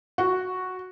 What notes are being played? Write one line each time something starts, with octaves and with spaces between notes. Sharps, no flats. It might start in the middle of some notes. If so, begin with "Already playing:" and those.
F#4